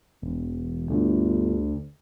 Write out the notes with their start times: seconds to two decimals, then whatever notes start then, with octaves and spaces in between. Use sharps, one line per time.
0.22 E1
0.90 G1 D2